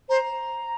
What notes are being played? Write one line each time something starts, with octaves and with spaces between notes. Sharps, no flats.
C5 A#5